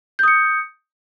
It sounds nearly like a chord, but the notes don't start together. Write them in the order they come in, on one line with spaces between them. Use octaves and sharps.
G6 D#6 C#7